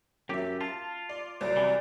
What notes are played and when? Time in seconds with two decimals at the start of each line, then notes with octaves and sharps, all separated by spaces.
0.29 F#2 F#3 G4 E5
0.61 F4 A5
1.09 D5
1.41 C2 F#3 D5
1.56 C3 E3